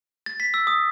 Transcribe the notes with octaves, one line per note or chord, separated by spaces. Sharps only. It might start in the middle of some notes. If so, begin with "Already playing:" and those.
A6
B6
E6
D#6